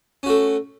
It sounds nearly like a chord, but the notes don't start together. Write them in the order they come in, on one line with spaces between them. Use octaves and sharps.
C#4 F#4 A3